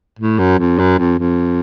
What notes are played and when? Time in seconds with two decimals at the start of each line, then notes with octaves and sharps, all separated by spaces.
0.19 A2
0.39 F#2
0.59 F2
0.79 F#2
0.99 F2
1.19 F2